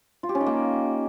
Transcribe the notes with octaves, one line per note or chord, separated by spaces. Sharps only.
F4
G4
C#4
D#4
A#3